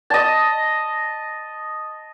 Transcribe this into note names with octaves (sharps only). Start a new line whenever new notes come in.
D#5 A5